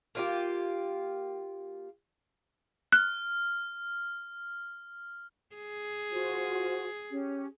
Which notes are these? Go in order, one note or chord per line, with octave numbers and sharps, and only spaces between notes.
A#3 F4 G4
F6 F#6
G#4
F4 F#4 C5
C#4 G4